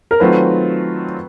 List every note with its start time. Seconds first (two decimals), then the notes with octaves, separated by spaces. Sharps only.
0.11 A#4
0.20 D#3 F#3 A3 C4 F4 B4